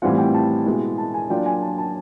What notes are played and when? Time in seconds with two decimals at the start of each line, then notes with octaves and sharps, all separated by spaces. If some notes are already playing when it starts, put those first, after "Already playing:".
0.02 A2 E3 G3 C4 F4 F#5
0.18 G5
0.34 A5
0.66 B2 G#3 B3 E4
0.98 A5
1.14 G#5
1.30 F#3 A#3 D4 F4 G5
1.46 G#5
1.62 A5
1.78 A5